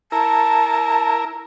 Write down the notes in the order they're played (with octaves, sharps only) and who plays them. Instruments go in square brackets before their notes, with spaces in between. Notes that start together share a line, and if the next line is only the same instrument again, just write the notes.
[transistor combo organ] E4 A#4 [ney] A5